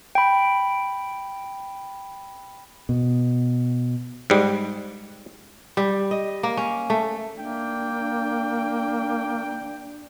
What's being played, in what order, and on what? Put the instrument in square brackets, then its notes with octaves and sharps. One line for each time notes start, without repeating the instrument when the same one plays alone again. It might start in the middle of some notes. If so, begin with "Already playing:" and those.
[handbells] G5 B5
[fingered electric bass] B2
[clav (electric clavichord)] G#2 G3
[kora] G3
D#5
A#3
C#4
A3
[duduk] A#3 [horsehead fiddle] D4 [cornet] G5